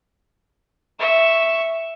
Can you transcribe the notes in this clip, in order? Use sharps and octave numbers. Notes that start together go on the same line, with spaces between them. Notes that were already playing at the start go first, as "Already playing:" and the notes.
E5 C#6